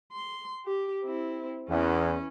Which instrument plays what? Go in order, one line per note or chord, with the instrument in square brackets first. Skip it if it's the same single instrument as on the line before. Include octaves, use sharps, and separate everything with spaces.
[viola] C6
G4
C4 E4
[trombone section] E2 [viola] E3 C#4